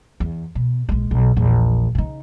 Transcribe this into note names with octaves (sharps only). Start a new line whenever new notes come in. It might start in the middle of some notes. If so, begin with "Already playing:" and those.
E2
B2
A#1 G#3
B1
A#1 E2
C#3 D#4